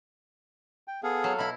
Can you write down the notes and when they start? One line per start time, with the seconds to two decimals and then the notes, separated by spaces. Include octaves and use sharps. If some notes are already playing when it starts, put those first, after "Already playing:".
0.88 G5
1.03 B3 G#4 A4 F5
1.24 F#3
1.38 B2 E4 B5